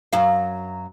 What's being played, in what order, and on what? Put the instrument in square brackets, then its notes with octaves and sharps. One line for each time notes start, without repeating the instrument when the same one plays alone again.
[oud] F#2 F#3 F5